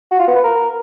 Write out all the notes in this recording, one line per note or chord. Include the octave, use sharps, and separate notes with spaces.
F#4
F4
B3
B4
A#4